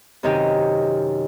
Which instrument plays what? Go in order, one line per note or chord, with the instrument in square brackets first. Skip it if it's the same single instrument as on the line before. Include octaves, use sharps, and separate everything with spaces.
[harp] F#2 C3 D#3 D#4 G4